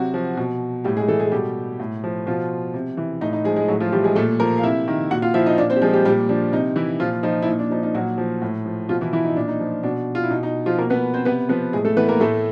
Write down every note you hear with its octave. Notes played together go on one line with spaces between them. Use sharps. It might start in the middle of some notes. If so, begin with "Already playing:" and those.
Already playing: C3 F#3 F#4
F3
B2
A2 G3 G4
G#3 G#4
E3 A3 A4
G#3 G#4
B2 G3 G4
A2
F3
B2 F3 F4
C3
E3
A2 D#4
D#4
F3 G#3 G#4
G#3 G#4
A2 F#3 F#4
F3 F4
E3 G3 G4
G#3 G#4
A#2 A3 A4
F3 A#3 A#4
F5
C3 E4 E5
D#3
A#2 F#4 F#5
F4 F5
F3 E4 E5
D#4 D#5
A#2 D4 D5
C4 C5
G4
F3 G#3 G#4
G3 G4
A#2 G3 G4
F3 D4
C3 D#4
E3 E4
A#2 F3 F4
F3 D#4
E4
A#2 D#4
D4
F3 D#4
D#4
A#2 F#3 F#4
F3
A2
F3
B2 F3 F4
E3 E4
E3 E4
D#4
A#2 D4
D#4
F3
B2 D4
F4
E4
B2 D#4
D#4
F3 F4
B2 A#3 A#4
B3 B4
C4 C5
C3 B3 B4
F3 B3 B4
A2 G#3 G#4
A3 A4
E3 B3 B4
A#3 A#4
A2 A3 A4